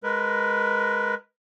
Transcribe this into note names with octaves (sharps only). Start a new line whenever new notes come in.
G#3 A#4 B4